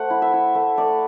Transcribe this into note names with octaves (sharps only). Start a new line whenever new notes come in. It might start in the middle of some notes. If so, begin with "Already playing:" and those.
Already playing: A3 C5 F#5
E4
E5
E4
A3 E5
A3 D5